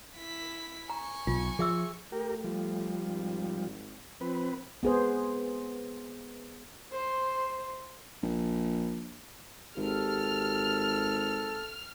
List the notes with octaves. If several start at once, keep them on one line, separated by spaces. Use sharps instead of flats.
E4 B6
G#5 A#5 C#6
B1 F4
F3 G#4 E5 E6
A3 G4 A#4
F3 G3
G#1
F3 C4 B4
B3 G#4 C5
C5
A#1
G#1 G4 A4 F6